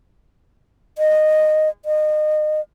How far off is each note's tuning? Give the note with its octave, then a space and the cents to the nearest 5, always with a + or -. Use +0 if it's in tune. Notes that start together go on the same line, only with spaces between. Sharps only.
D#5 -10
D#5 -30